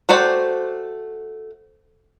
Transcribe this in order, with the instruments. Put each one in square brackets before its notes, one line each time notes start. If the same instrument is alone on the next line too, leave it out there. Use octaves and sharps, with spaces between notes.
[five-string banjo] A3 F#4 C5 D5 G5